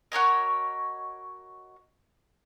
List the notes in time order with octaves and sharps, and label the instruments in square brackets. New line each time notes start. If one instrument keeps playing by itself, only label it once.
[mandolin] F#4 A#4 C#5 D#5